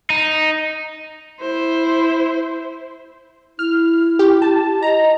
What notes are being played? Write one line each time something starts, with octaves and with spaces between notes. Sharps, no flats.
D#4
E4 C5
E4 F6
G4
A5
D#5 A#5